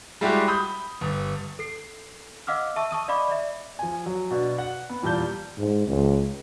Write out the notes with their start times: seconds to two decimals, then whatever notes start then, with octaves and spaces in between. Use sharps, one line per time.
0.21 G3 G#3 E4 F#4 G4
0.47 B5 D#6 G6
1.01 G1
1.59 A4 C7
2.47 D#5 F5 F#5 D6 E6 F6
2.76 E5 A5 C#6 E6
2.91 A5 C#6 D#6 D#7
3.08 D5 D#5 F5 B5 D6
3.28 D5 E5
3.79 F3 G#5
4.06 F#3
4.31 B2 D4 F#4
4.58 F#5
4.90 B3
5.02 E2 A#2 G3 A#3 A5 G6
5.58 G#2
5.88 C#2